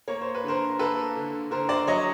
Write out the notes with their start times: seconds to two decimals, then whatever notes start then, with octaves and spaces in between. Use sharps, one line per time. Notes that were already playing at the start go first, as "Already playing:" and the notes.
0.08 A#3 C#5
0.21 C5
0.35 B4
0.44 D3 A#4 C5
0.79 A#3 A4 B4
1.16 D3
1.51 D3 A#4 C5
1.69 C5 D5
1.87 F#3 C#5 D#5